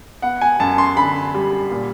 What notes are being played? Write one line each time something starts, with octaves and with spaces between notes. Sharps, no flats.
B3 F#5
G#5
F#2 A5
C6
D3 B5
G3
A#2